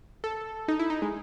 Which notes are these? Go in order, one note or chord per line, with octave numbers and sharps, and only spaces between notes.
A4
D#4
E4
D#4
G#3